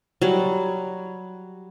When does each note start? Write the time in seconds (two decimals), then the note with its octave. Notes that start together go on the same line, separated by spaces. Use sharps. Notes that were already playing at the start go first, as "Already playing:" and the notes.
0.22 F#3 G3